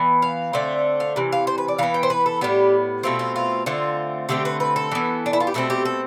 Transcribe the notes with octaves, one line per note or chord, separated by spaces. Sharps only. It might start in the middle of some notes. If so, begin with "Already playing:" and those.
Already playing: E3 B3
F5
D3 A3 C4
F5
C3 E3
F5
C5
B4
D5
E3 B3 F5
G5
C5
B4
A4
A2 G3 B3 G4
B2 A3 C4 F4
F4
F4
D3 A3 C4 F4
D3 A3 C4 G4
B4
B4
A4
E3 B3
D4
E4
F4
G4
B2 A3 C4 A4
G4
A4